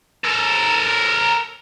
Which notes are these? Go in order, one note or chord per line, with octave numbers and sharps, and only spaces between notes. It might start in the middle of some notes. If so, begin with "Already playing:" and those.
A4 A#4